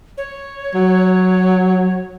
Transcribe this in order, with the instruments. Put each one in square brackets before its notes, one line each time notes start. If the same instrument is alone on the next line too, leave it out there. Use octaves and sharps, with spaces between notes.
[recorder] C#5
[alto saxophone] F#3